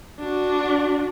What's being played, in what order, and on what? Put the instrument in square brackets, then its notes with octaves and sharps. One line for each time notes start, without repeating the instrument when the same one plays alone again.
[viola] D4 F#4